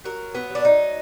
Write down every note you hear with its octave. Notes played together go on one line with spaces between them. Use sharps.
F#3 A#4
B3
F#3
D4
D#4